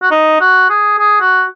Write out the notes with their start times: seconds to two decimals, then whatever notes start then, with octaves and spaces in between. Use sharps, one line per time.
0.02 F#4
0.11 D#4
0.41 F#4
0.70 G#4
0.98 G#4
1.20 F#4